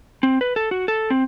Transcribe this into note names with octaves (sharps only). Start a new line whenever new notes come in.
C4
B4
A4
F#4
A4
C4